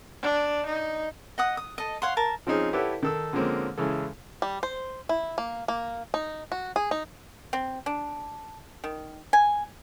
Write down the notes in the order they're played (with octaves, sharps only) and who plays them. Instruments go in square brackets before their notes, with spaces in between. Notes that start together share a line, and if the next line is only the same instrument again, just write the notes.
[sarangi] D4
D#4
[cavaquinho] D#5 F#5 D#6
D#6
A4 D#5
C#5 F5 F#5 C6
A#4 A5
[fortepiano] F3 C4 C#4 D#4 G#4
E4 G4 A4 B4 C#5 F#5
D#3 A4 E6
D3 F3 G#3 A#3 C4 C#4
C#3 E3 G#3 A4
[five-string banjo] G3
C5
E4
A#3
A#3
D#4
F#4
G#4
D#4
[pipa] C4
D4
D#3
G#5